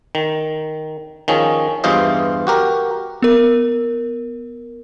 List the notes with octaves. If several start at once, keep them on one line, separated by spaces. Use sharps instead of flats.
D#3
D#3 F3 C#4 G#4
E2 G2 E3 F4 C5 D#5
F#4 G4 A#4
B3 A#4